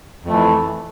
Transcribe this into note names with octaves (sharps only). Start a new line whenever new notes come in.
F2 E3 A3